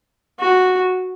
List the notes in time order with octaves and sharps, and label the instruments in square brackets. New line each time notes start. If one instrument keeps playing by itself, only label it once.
[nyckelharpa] F#4